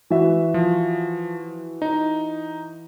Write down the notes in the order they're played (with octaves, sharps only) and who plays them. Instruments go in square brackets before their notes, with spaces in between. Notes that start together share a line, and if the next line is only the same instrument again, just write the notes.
[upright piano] E3 F#4 E5
[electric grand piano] F3
D#4